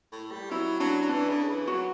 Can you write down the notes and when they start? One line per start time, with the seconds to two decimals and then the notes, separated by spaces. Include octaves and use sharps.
0.12 A2
0.31 G3
0.51 F#3 E4
0.80 F#3 D4
1.02 F#3
1.09 E3 D4
1.29 C#3
1.48 E3
1.67 F#3 F#4